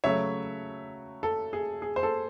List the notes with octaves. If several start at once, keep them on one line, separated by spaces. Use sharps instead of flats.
C#3 F#3 A3 C#5 E5
A4
G#4
G#4
C5
A4